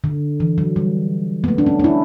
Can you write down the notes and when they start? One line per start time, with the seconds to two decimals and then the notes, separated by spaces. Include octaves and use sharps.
0.04 D3
0.40 E3
0.58 F#3
0.76 G3
1.44 B3
1.48 A3
1.58 D4
1.66 C#4
1.79 D4
1.84 E4